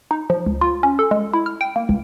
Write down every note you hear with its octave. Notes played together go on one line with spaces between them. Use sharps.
D#4
F3
C#2
F4
C#4
A4
G#3
E4
F6
G5
A#3
C#2